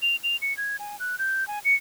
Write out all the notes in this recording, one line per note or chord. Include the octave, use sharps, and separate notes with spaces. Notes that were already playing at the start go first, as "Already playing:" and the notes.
F7
F7
C#7
G#6
G#5
F#6
G6
G#5
C#7